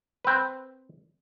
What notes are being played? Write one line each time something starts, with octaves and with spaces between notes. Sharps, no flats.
C4 B4